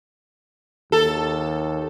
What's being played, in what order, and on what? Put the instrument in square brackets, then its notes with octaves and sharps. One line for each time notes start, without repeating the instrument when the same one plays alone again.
[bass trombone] D#2 [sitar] A4